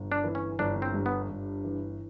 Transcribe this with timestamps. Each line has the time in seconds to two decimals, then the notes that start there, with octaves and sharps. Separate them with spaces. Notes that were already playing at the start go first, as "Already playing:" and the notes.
Already playing: G1
0.12 D4
0.24 E3
0.35 C#4
0.59 G1 D4
0.82 C4
0.94 G2
1.06 B3
1.29 G1
1.64 E3